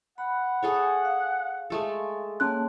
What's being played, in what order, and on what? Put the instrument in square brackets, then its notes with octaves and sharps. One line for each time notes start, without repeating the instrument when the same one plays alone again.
[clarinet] F#5 [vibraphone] B5
[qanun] G#4 A4 C#5
[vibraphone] F5
[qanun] G#3 A3 A4
[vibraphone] A#3 A5 C6 [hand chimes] C#4 F#6